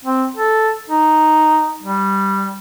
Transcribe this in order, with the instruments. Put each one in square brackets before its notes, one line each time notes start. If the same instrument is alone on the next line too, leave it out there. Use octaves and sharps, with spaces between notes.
[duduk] C4
A4
D#4
G3